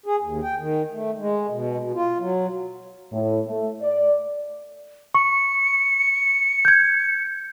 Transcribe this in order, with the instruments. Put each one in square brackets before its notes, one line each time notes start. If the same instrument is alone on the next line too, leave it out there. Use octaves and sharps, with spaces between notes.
[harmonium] G#4
D#2
G5
D#3
A3
G#3
B2
B2
F4
F#3
[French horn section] A2
A3
D5
[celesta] C#6 [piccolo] C#7
[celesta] G6 G#6